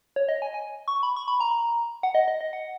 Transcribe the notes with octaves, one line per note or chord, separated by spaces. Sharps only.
C#5
D#5
G#5
G#5
C#6
B5
C#6
B5
A#5
F#5
D#5
D#5
D#5
F#5